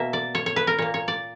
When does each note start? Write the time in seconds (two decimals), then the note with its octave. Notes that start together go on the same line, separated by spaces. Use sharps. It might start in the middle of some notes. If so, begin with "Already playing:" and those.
Already playing: B2 A#3 E5
0.13 D5
0.35 C#5
0.46 C#5
0.56 B4
0.67 A#4
0.78 A#2 A#3 C#5
0.94 C#5
1.08 D5